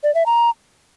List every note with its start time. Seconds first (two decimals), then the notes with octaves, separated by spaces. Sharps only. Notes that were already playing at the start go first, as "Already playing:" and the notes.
0.03 D5
0.15 E5
0.26 A#5